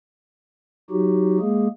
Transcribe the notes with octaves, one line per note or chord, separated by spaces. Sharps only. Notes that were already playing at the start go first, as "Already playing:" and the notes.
F#3 D#4 F#4 G4
G#3 A#3 G#4